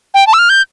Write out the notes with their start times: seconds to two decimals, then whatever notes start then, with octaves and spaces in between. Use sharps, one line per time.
0.14 G5
0.27 A5
0.33 E6
0.38 F6
0.49 G6